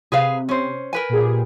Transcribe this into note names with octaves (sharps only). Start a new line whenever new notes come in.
C3 G#4 B4 F5
C#4 C5
A#4 B4 G#5
A#2 G4 G#4